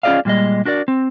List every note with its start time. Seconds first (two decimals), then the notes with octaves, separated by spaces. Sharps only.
0.03 C#4 F4 G#4 D5 D#5 F5
0.25 A#2 G3 G#3 D#5
0.65 D4 F#4 A#4 D5
0.88 C4